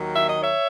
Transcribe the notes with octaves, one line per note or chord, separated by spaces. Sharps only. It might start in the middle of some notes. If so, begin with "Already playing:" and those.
Already playing: D#2 D#3 F#3
E5
D#5
C#5 E5